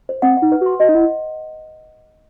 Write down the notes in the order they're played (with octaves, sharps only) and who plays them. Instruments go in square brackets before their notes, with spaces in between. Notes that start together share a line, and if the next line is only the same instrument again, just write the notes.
[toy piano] C5
[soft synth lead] C4 [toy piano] F#5
[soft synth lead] D#4 [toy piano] F#5
[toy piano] B4
[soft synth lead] F#4 [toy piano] C6
[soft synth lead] F#4 [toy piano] D#5
[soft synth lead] D#4
[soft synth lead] E4 [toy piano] F#5